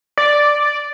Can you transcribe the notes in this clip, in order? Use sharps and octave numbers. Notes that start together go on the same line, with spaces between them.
D5